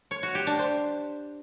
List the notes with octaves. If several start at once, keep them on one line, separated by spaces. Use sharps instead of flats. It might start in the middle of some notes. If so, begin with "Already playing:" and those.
C#5
F#4
G4
D4
C5